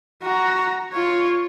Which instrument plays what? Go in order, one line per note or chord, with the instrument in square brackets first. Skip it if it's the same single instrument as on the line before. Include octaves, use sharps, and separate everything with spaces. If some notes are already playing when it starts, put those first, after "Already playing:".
[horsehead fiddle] F#4 A#5
F4 C#5